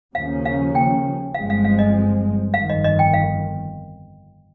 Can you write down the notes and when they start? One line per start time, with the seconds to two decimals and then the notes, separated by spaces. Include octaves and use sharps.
0.14 D#2 C#3 F3 A#3 C#4 F5
0.45 F5
0.75 G5
1.34 G1 G2 F3 G#3 C4 F5
1.50 F5
1.65 F5
1.79 D#5
2.54 G1 F2 D#3 F5
2.70 D#5
2.84 D#5
2.99 G5
3.14 F5